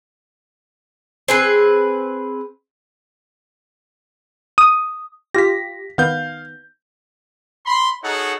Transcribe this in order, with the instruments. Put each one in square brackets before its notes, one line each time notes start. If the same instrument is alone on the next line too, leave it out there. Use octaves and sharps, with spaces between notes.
[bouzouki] C4 G#4 B4
[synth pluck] D#6
[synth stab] F4 G4 [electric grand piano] A#6 B6
[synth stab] D#3 B3 [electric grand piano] F5 G6
[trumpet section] B5 C6
D#4 F#4 G#4 A4 C#5 F#5